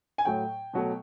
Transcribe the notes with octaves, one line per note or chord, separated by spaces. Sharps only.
G#5
A2 F#3 A3 G5
B2 F#3 A3